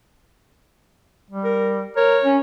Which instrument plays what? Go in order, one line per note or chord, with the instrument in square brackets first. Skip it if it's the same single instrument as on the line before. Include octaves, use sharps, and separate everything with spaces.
[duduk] G3
[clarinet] A#4
[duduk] A#4 [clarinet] C#5
[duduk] C#4